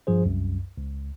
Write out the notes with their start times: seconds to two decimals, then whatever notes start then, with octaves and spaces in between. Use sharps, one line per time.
0.07 G2 F3 G#4 C5
0.25 C2 F#2
0.78 C#2